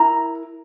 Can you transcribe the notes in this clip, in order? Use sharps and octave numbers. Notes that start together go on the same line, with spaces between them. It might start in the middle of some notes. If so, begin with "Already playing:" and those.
Already playing: E4 A#4 A#5